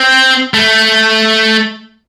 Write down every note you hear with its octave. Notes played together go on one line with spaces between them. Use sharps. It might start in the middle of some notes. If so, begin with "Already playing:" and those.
Already playing: C4
A3